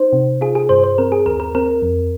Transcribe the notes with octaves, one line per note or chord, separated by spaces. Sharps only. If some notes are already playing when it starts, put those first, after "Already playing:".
Already playing: D#4 C5
C3
F4 G#4
G#4
G2 C5
C5
C4 A#4
G#4
D#2 A#4
A#4
C4 A#4
F2